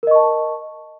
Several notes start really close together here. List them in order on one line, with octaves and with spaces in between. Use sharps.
A#4 D#5 C#6 A5